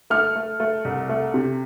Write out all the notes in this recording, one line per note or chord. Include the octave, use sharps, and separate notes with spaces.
A3 F6
A3
A3
C2
A3
C3